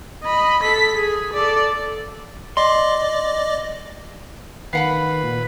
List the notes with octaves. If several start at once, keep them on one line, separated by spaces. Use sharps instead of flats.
D#5 B5
A4 B6
G#4
A4 D5
D5 D#5 C6 D6
D#3 B4 F5 F#5 B5
A#2